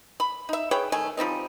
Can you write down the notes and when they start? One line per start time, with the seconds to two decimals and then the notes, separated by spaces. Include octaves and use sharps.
0.20 B5
0.49 D#4 E5
0.71 G#4 B4 C#5 G5
0.92 D#3 A3 G#5
1.17 F3 G3 C4 D#4